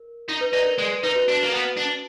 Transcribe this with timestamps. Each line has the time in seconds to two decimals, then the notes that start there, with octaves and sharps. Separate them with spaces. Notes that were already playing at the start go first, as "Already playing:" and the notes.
Already playing: A#4
0.29 D#4
0.41 B4
0.53 D#4 D5
0.66 A#4
0.78 G#3 D5
1.03 D#4 B4
1.16 F#4
1.28 D4 F#4
1.43 A#3
1.52 B3
1.77 D4